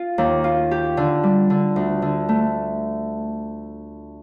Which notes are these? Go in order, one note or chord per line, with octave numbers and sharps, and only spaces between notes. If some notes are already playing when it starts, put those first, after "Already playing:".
Already playing: F4
D#2
F4
G4
D3
G3
D3
D2
D3
A3